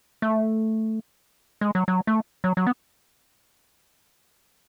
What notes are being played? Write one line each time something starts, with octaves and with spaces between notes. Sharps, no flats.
A3
G#3
F#3
F#3
A3
F#3
F#3
B3